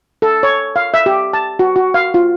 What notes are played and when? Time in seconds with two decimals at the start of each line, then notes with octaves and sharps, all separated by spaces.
0.22 A4
0.43 C#5
0.76 F5
0.94 E5
1.06 G4
1.33 A5
1.59 F#4
1.76 F#4
1.94 F5
2.14 F4